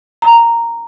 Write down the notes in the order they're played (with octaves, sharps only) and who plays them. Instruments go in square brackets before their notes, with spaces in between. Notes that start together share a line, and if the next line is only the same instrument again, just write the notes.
[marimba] A#5